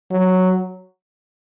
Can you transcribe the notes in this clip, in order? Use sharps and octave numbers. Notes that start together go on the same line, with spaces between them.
F#3